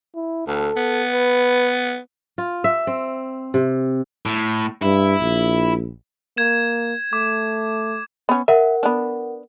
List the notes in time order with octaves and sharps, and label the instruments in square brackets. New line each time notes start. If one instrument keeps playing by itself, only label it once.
[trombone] E4
[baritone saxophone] D2 [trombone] A4
[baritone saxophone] B3
[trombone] B4
[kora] F4
E5
C4
C3
[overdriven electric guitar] A2
[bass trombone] G2 [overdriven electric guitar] E4
[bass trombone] A#1
[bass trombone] A#3 [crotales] G#6 E7
[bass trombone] A3 [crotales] D6
[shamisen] B3 C#4
[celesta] A#4 F#5 [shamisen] E5
[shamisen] B3 D4